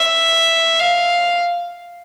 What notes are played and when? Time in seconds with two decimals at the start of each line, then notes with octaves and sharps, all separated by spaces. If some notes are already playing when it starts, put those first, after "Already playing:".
Already playing: E5
0.80 F5